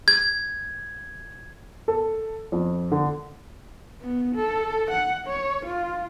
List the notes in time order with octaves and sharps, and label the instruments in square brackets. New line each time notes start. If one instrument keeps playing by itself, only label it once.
[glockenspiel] G#6
[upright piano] A4
F2
D3
[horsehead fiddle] B3
A4
F#5
C#5
F4